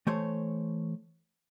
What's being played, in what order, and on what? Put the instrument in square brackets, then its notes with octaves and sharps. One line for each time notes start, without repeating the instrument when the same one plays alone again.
[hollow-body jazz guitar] E3 A3 C5 C#5